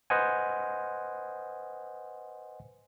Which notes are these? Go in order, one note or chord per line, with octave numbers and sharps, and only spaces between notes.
B4 C5 D#5 F#5 G#5